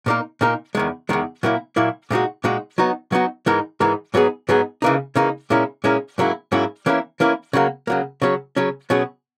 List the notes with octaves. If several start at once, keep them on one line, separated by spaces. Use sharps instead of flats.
A#2 A#3 D#4 A#4
A#2 A#3 D#4 A#4
E2 D#3 G#3
E2 D#3 G#3
A#2 F#3 A#3 E4
A#2 F#3 A#3 E4
A#2 G#3 D#4 F#4
A#2 G#3 D#4 F#4
F#3 B3 D#4 F#4
F#3 B3 D#4 F#4
G#2 E3 G#3 D#4 A#4
G#2 E3 G#3 D#4 A#4
G#2 F#3 B3 D#4 G#4
G#2 F#3 B3 D#4 G#4
C#3 E3 A#3 D#4
C#3 E3 A#3 D#4
A#2 G#3 C#4 E4 A#4
A#2 G#3 C#4 E4 A#4
G#2 F#3 A#3 C#4 E4
G#2 F#3 A#3 C#4 E4
E3 A#3 C#4 E4 A#4
E3 A#3 C#4 E4 A#4
C#3 F#3 A#3
C#3 F#3 A#3
C#3 F#3 C#4
C#3 F#3 C#4
B2 F#3 C#4 G#4